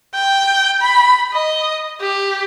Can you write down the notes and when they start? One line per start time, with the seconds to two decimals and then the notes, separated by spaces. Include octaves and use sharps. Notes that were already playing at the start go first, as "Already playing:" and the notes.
0.15 G5
0.81 B5
1.33 D#5
2.01 G4